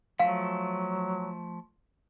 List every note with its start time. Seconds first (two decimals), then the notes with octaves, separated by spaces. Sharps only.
0.20 F3 F#3 A3 F5